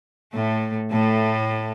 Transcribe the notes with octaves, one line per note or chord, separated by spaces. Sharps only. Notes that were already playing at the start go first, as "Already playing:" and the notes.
A2 A3
A2 A3